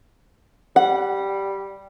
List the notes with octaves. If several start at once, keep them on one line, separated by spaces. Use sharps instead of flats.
G3 F#5